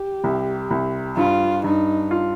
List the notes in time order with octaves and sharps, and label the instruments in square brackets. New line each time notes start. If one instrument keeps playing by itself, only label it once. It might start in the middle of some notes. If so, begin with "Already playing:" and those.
Already playing: [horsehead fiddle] G4
[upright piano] C2
C2
[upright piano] G2 [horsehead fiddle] F4
[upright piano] G2 [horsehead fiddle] D#4
[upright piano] F4